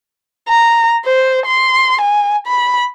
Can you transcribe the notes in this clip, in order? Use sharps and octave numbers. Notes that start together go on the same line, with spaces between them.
A#5
C5
C6
G#5
B5